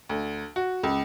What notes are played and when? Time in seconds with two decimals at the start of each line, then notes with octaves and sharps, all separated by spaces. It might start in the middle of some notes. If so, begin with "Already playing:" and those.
0.09 D2
0.56 F#4
0.83 C#2